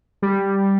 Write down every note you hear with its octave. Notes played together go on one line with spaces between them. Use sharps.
G3